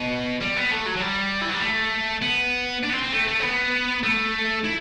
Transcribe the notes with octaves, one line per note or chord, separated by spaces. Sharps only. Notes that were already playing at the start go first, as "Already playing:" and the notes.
Already playing: B2
G3
B3
A3
F#3
F#3
G3
E3
F#3
G3
A3
B3
D4
B3
C4
C4
A3
A3
C4
B3
A3
E4